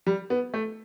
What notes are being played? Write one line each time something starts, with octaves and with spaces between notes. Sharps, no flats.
G3
B3
A3